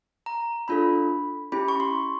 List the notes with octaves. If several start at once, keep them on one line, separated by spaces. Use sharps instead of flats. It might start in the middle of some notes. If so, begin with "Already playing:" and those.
A#5
D4 F4 A4 B5
C#4 E4 G4 B5
C#6
C6